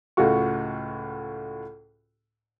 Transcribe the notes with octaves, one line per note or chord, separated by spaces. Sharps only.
C#2 A2 A3 F4 F#4 C#6